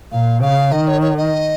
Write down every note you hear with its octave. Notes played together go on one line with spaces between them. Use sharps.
A#2 F5
C#3 F5
D#3 D#5
C#5
C#5
D#5